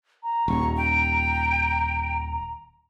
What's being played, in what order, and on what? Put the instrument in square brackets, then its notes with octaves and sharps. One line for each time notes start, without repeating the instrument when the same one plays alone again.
[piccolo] A#5
[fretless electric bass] D#1 [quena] C#6
[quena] G5